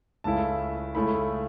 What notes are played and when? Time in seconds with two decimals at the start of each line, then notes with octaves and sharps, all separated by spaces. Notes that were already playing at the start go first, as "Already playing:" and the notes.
0.24 C#2 C#3 A3 E4 A5
0.95 C#2 C#3 A3 E4 B5